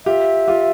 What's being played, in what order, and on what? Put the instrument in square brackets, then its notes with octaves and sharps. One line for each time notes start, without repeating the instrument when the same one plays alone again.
[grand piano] F4 G4 [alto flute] E5
[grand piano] F4 G4